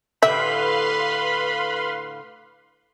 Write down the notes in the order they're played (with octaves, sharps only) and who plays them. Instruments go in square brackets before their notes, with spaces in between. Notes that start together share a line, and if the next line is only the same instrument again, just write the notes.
[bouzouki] A2 D3 G4 [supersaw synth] B4 F5 C6 [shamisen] E5 [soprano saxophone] B5